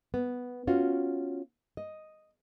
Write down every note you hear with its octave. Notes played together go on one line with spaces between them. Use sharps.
B3
C#4 F4 F#4
D#5